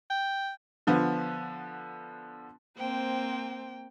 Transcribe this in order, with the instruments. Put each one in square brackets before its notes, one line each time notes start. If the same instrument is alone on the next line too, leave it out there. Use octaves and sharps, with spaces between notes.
[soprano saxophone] G5
[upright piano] D3 F3 B3
[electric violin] A#3 G5 [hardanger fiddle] C4 C5